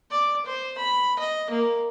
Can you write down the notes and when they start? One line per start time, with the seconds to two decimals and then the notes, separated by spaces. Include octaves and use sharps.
0.11 D5
0.46 C5
0.78 B5
1.19 D#5
1.50 A#3